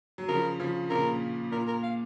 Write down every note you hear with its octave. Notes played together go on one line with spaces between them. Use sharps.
F#3
C#3 F3 A#4
C#3 F3
A#2 C#3 A#4
A#2 A#4
A#4
F5